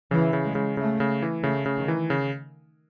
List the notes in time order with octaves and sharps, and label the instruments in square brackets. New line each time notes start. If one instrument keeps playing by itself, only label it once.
[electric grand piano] C#3 [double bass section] E3
[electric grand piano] C#3
[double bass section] G#3
[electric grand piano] C#3
[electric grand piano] C#3 [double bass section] A3
[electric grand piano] C#3
E3
[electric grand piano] C#3 [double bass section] A3
[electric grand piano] C#3
[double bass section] D#3
[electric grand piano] E3
C#3